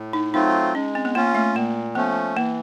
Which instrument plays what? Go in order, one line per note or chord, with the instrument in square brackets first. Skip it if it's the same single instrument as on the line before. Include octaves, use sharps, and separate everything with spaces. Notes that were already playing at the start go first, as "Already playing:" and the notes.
Already playing: [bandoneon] A2
[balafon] D#4
[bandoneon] F#3 A3 C4 F4 [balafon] D#4
[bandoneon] G#3 [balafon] C#4
[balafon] C4
B3
[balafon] A#3 [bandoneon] C#4 F4
[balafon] A3
[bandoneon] A#2 [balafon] A#3
[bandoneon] F3 A3 C#4 [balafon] B3
[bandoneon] E3 [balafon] A#3